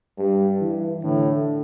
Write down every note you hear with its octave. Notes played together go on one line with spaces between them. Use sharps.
G2 G3
E3
A2 D3